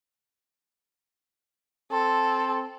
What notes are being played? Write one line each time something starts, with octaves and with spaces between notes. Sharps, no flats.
C4 A4